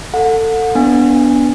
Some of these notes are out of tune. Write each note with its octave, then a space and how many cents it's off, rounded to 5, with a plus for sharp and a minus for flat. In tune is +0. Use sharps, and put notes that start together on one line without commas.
A4 +25 F#5 -30
B3 +0 D4 -15 G#5 -15